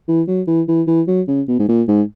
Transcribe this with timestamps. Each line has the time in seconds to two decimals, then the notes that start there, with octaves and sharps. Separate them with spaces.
0.08 E3
0.28 F#3
0.48 E3
0.68 E3
0.88 E3
1.07 F#3
1.28 C#3
1.48 B2
1.59 G#2
1.68 A#2
1.88 G#2